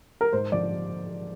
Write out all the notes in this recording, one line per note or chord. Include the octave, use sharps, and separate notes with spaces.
A#4
G#2 C5
F3 D5